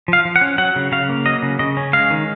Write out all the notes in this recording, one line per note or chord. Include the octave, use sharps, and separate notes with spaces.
F3 F5
F3
F#5
C#4
F#3 F#5
C#3
C#3 F5
A#3
F#3 D#5
C#3
C#3 D#5
C#4
G#3 F5
D#3